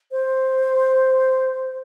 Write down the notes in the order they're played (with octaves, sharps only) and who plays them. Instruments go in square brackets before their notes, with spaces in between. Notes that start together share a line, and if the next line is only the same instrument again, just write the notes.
[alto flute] C5